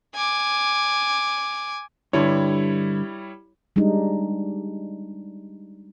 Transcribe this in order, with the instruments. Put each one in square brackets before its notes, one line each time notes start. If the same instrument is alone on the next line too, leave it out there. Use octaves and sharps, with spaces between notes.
[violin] G#5 D6
[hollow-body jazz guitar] G2 D3 [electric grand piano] G3 E4 C#5
[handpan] G3 G#3 D4 D#4